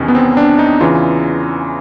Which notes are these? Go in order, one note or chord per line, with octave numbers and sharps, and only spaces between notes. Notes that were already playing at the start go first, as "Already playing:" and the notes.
Already playing: E2 C3 D#3 C#4
B3
C4
D4
D#4
E2 C#3 E3 F4